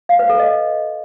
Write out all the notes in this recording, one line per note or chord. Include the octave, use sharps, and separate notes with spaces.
F5
B4
A4
D#5